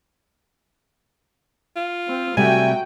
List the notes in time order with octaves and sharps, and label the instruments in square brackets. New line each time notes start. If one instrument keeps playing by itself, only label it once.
[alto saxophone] F4
[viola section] C4
[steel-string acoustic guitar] C3 G3 A3 [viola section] F#3 F#4 G5 [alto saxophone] G#5